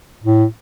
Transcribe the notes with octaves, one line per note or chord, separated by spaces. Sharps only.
A2